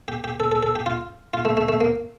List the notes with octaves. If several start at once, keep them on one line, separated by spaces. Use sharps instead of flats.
G4
G4
A4
A4
A4
G4
F4
F4
A3
A3
A3
A#3